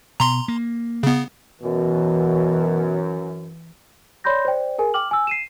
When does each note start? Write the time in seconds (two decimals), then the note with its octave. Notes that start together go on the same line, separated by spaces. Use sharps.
0.20 B2 A#5 C6
0.48 A#3
1.03 C#3 B3
1.63 F#2 B2 E3
4.24 C#5 D5 B5 C6 G6 A#6
4.45 C5 D5 G5
4.78 G#4 A#4 G#5
4.94 G5 D6 F6 F#7
5.11 G#5 E6
5.27 C7 D#7 E7